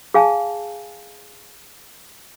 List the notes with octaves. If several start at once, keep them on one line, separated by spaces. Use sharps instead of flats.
G#4 F5 G#5 A5